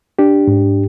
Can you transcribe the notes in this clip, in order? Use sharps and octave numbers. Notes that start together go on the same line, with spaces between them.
D4 G4
G#2